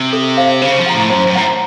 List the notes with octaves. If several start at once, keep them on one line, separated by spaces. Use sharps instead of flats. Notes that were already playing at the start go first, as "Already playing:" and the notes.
Already playing: C3
A4
C5 F5
C#3 C5
F3
F#5 A#5
A2
F#2 C5
F#2
A2 F#5 A#5